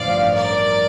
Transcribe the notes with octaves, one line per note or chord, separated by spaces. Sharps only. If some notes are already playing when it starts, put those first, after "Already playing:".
Already playing: A1 G2 D3 F3 D5 F5
A#4 D5